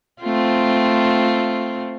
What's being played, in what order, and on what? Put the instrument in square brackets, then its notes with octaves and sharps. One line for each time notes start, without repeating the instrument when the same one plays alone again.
[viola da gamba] A3 C4 F4